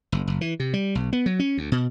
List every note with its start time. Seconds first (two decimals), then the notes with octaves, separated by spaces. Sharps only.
0.12 F#1
0.27 F#1
0.41 E3
0.60 C3
0.74 G3
0.95 B1
1.13 B3
1.26 F#3
1.39 C#4
1.58 D2
1.72 B2